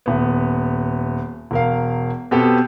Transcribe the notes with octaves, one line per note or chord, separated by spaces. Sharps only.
D#1 B3
E1 A#4 F5
B2 B3 C4 G4 A4